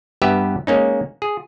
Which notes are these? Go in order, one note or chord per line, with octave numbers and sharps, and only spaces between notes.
G2 B3 G4 B4 E5
G#3 A#3 C#4 D#4
G#4